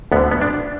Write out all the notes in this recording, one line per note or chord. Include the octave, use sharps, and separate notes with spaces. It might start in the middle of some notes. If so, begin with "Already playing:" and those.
D2 D3 B3
B3
D4